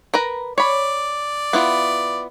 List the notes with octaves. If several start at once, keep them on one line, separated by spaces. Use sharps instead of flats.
A#4 B4 A#5
C#5 D5 B5
B3 E4 F4